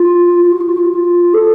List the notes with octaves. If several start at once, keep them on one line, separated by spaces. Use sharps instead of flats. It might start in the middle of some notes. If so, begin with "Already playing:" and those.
Already playing: F4
F4
F#4
F4
F#4
F4
F#4
F4
A4